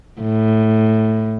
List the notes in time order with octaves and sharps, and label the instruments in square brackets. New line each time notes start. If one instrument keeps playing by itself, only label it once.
[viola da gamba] A2